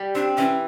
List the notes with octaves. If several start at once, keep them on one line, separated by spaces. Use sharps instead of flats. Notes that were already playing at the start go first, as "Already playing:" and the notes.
Already playing: G3
C4 D4
E3 C#4